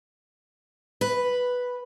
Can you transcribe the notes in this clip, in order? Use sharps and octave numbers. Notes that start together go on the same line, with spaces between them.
B4